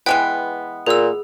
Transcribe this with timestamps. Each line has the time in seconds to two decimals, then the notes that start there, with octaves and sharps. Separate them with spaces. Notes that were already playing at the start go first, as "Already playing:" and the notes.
0.06 E3 G#3 B3 G5
0.86 A#2 G#4 E6